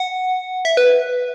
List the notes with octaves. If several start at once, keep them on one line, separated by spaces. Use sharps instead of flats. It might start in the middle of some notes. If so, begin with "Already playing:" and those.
Already playing: F#5
E5
B4